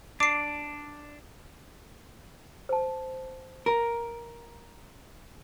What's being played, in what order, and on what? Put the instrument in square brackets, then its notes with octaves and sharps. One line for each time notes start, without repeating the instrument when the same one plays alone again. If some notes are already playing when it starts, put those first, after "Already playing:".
[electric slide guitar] D4 [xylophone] D6 C7
[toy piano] C5 A5
[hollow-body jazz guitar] A#4